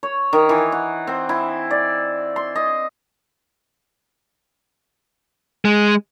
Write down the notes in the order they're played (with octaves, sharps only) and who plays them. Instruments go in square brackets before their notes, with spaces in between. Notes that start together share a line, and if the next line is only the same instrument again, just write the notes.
[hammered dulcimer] C#5
D#3
E3
F#5
C4
E4
D5
C6
D#5
[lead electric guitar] G#3